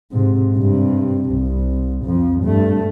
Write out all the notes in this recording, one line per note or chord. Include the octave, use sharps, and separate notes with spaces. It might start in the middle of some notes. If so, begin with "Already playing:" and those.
G#2 C3
G2 C3
C2
F2 F3
G2 A3